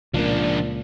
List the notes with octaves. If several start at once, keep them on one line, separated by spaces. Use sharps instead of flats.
C#2 A#2 F3 D4